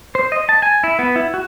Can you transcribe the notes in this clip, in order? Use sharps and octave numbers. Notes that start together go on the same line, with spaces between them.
C5
D#5
A5
G#5
E4
B3
E4
F#4